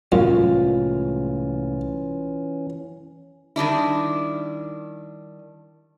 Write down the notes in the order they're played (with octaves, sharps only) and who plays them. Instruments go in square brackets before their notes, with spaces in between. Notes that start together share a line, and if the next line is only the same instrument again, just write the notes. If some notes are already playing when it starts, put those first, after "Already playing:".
[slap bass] C2 A2 G#3 [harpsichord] F#2 [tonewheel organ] E3 C#4 [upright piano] F4
[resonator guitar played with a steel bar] D#3 G3 D4 E4